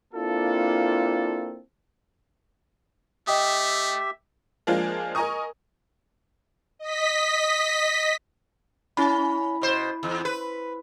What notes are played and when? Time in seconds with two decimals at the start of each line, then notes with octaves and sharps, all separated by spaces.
0.14 A#3 C4 D4 E4 F4 A4
3.27 A3 G4 D#5 E5 G5 D#6
4.67 F3 G#3 A#3 D4 F4 G#4
5.15 A#4 D#5 G#5 A#5 C#6 D#6
6.79 D#5 B6
8.97 C#4 E4 B5
9.61 B2 C5
10.03 E2
10.25 B4